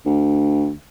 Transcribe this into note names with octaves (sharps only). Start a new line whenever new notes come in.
D2